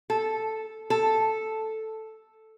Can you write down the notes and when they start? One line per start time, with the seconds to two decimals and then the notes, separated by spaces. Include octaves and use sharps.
0.10 A4
0.90 A4